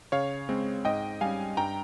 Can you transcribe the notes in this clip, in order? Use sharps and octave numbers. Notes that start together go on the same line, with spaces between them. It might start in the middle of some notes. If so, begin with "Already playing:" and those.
C#3 C#5 F5
G#3 C4
G#2 D#5 G5
G3 C#4 F5 G#5
G2 G5 A#5